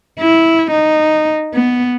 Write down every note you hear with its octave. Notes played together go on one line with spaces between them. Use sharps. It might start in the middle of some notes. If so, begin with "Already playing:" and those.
E4
D#4
B3